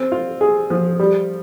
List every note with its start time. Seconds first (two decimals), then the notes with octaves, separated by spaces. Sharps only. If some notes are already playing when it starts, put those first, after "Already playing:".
Already playing: C4
0.12 F4
0.41 G#4
0.70 F3
0.99 G3